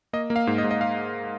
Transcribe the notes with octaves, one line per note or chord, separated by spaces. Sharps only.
A#3 D#5
A#3
F5
G#2
D#5
G#2
D#5
F5